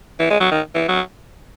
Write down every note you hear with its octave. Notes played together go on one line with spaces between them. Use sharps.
E3
G#3
F#3
D#3
E3
F#3